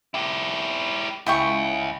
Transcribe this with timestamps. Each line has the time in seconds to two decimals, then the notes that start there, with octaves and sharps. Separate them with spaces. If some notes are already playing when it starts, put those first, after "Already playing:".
0.14 E4 G4
1.26 C#2 E4 G5 C#6